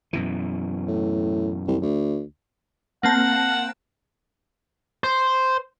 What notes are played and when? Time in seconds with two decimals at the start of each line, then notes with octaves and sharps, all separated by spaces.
0.13 F#2 B2 E3
0.87 A2
1.67 C2
1.82 D2
3.03 A#3 C4 F#5 A5
5.04 C5